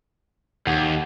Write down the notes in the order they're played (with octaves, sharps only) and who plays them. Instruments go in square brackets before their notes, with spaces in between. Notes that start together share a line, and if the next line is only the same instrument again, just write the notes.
[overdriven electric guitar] D#2 [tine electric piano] F#5